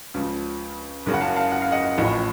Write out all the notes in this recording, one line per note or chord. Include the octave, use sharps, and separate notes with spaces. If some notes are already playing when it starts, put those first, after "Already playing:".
C#2 C#3 F3
F#1 F#2 C#3
F#5
F5 A5
F5 A5
F#5
F5
D#5 F#5
A1 A2 F3